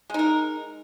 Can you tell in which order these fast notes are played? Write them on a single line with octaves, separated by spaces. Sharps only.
G#3 D#4 A#4